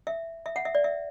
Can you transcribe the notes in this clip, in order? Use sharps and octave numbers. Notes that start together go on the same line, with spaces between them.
E5
E5
F#5
E5
D5
E5